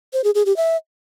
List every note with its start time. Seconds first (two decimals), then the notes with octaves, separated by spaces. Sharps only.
0.13 C5
0.24 G#4
0.35 G#4
0.46 G4
0.57 E5